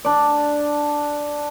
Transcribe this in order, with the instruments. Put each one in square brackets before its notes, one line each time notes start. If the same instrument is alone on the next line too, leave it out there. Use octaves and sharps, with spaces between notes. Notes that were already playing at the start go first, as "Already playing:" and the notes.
[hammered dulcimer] D4 D5